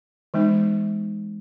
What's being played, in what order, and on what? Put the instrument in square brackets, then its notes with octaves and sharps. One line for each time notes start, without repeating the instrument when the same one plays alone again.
[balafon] E3 G#3 B3 D#4